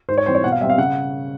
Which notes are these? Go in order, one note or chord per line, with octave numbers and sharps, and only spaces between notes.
G#2 C5
C#5
E3 G3 C4 C5
C#5
B2 F#5
F5
G3 C4 E5
F5
C#3 F#5